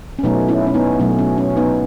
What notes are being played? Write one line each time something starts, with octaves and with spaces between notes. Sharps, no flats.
C#4
B2 F#3 A3 B3 D#4
C#4 E4
C#4
B3 D#4
B2 F#3 A3 C#4
C#4
C#4
B3 D#4